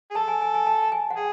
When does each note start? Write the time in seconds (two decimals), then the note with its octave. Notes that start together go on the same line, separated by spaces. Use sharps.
0.11 G#4
0.15 A4 A5
0.28 G#5
0.42 G#5
0.55 G#5
0.67 A5
0.82 A5
0.92 G#5
1.10 F#5
1.18 G#4 G5